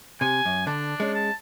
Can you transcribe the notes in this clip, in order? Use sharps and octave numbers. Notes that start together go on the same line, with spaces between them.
C3 G#5
F#2
D3 D4
G#3 C#4
A5